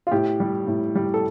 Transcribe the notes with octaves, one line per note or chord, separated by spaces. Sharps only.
F4
A2 G4
G3
A2
G3
A4